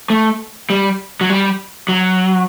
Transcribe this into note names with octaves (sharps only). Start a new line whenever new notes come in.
A3
G3
F#3
G3
F#3